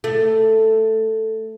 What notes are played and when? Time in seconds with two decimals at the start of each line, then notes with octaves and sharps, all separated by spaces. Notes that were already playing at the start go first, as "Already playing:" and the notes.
0.04 A3